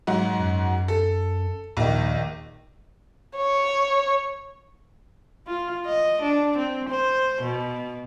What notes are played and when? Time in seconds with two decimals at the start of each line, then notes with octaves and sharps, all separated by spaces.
0.07 G#2 F#3 F#4
0.40 F#2
0.88 A4
1.77 A#1 D#2 D#3
3.37 C#5
5.47 F4
5.86 D#5
6.22 D4
6.58 C4
6.89 C5
7.42 B2